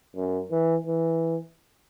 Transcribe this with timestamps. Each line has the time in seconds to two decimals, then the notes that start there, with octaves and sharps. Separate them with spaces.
0.16 F#2
0.51 E3
0.87 E3